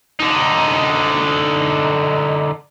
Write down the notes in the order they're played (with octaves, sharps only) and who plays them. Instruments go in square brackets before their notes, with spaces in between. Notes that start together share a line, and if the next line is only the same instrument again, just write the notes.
[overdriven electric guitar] D3 D#4